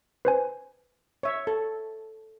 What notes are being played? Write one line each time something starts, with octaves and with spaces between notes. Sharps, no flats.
B4 C5 G#5
C#5 E5
A4